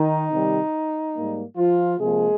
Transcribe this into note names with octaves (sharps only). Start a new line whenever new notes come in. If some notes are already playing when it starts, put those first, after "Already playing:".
Already playing: D#3 D#4
C3 D#3 G3
G#2 G3 A#3
F3 F4
C3 F3 G#3 A#3 G#4